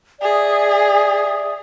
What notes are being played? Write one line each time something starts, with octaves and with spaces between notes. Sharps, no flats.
G#4 D5 E5 D#6